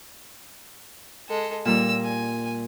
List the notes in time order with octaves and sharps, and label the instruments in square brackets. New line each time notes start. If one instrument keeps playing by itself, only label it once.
[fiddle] G#3 A4
[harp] A#2 G3 A#4 [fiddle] E6
[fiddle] G#5